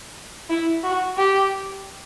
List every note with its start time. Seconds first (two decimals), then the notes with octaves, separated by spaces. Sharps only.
0.50 E4
0.83 F#4
1.17 G4